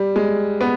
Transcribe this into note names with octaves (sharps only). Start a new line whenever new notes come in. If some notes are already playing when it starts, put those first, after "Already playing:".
Already playing: G3
G#3
B3